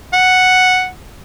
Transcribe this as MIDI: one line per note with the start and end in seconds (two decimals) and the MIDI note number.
0.13 0.87 78